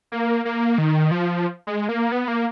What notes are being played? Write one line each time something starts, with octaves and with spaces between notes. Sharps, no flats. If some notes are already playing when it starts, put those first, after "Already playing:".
A#3
A#3
D#3
F3
G#3
A#3
B3
A#3